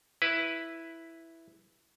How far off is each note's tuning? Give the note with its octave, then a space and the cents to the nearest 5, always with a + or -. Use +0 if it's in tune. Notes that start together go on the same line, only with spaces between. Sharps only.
E4 +0 B4 +0